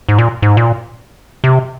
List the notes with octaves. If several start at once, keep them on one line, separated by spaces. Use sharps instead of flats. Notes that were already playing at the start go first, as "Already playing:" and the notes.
G#2
A#2
G#2
A#2
C3